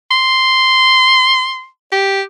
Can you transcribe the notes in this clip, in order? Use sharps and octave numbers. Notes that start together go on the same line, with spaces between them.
C6
G4